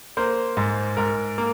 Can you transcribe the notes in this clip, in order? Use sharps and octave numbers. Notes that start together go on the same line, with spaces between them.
A#3 C5
G#2
G#2 A#4
A#3